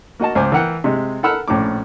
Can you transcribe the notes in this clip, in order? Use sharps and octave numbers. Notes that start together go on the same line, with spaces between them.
A#3 F#4 D#5 A5
C#2 C5 G#5 D6
E3 A#4 F#5 G5
C3 G#3
A4 A#4 F#5 B5 E6 F6
A#1 A2 C#4 D6